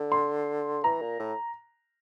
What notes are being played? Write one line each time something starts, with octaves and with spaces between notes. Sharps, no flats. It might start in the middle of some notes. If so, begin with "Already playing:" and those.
Already playing: D3
C6
E3 A#5
A#2
A2